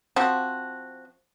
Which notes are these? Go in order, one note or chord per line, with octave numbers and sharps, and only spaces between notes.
F3 C4 F#4